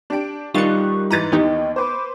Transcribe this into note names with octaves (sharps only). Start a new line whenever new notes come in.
D4 G4 D7
D#3 G3 D#4 F4 C#6 F#6 A6 C#7
G#2 E3 A#5 A6 D#7
D#2 E3 B3 D#4 G4 D#5
B4 C5 D6